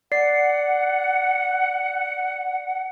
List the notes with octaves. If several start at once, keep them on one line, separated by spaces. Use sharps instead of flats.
D5 F#5 C7